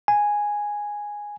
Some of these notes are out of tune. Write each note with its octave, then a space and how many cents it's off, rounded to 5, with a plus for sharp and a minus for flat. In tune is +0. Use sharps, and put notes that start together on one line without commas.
G#5 -5